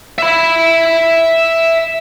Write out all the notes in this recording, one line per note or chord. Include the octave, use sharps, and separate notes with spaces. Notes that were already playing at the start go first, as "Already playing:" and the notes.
E5 B5